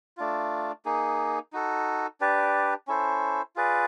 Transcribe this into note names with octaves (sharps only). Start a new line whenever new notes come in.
A3 D4 F4
A#3 D#4 G#4
D#4 F#4 A4
D4 G4 B4 D5
C#4 E4 A4 C5
F4 G#4 B4 D5